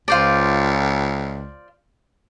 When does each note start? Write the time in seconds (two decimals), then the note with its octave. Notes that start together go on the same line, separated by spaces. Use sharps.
0.08 C#2 F4 C5 D5